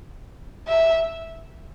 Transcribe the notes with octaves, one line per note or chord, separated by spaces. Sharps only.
E5